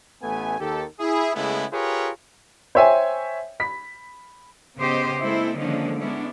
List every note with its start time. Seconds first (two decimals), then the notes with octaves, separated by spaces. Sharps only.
0.23 A1 A3 B3 G#5
0.60 D#2 D#3 G4 A4
0.99 E4 G#4
1.35 C#3 G#3 A3 B3 E4
1.73 F4 G4 G#4 A#4 B4 C#5
2.75 C5 C#5 E5 G5 G#5
3.60 B5 B6
4.78 C#3 B3 G4 C5 D#5
5.21 G#3 A#3 C4 E4 A4 C5
5.57 D3 D#3 F3 G#3 A#3 C#4
6.00 G#3 B3 C#4 D4 E4